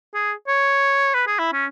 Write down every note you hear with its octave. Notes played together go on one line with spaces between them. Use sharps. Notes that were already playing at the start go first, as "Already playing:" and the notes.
G#4
C#5
B4
G#4
E4
C#4